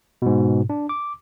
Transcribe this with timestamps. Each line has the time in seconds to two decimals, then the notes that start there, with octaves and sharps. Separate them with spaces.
0.22 G#2 B2
0.70 D4
0.89 D6